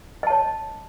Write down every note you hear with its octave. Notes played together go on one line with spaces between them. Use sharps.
C#5 D#5 A5